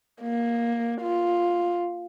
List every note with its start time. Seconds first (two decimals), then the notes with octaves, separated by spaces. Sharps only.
0.22 A#3
1.02 F4